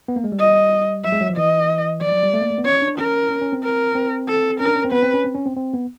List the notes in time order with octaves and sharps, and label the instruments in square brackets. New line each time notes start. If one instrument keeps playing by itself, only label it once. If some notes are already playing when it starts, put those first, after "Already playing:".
[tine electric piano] B3
A#3
G#3
G3
[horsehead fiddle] D#5
[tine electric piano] F#3 [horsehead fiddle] E5
[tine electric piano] G#3
F#3
F3
[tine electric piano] E3 [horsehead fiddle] D#5
[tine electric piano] F3 [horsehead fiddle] D5
[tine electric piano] F#3
G3
A3
A#3
A3
B3
[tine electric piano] C#4 [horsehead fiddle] C#5
[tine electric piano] D4
[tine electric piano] C#4 [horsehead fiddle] A#4
[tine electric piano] C#4
C#4
C4
[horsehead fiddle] A#4
[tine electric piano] C4
[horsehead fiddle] A4
[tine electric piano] C#4 [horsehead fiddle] A#4
[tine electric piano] D4
C#4
C4
[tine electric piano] B3 [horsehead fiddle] B4
[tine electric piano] C4
C#4
C4
C#4
C4
C4
B3